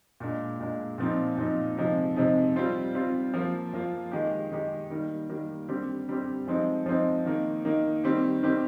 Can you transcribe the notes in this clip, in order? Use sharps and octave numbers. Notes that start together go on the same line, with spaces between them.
A#2 G#3 D4
A#2 G#3 D4
A#2 F3 C4 D#4
A#2 F3 C4 D#4
C3 F3 G#3 D#4
C3 F3 G#3 D#4
G3 C4 F4
G3 C4 F4
F3 A#3 F4
F3 A#3 F4
D#3 G#3 D#4 G4
D#3 G#3 D#4 G4
D#3 G3 A#3
D#3 G3 A#3
D3 G3 C4 G4
D3 G3 C4 G4
F3 G#3 C4 D#4
F3 G#3 C4 D#4
D#3 A#3 D#4
D#3 A#3 D#4
D#3 G3 C4 G4
D#3 G3 C4 G4